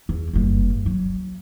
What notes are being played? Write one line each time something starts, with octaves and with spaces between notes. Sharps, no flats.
E2
F#1 G2
F#3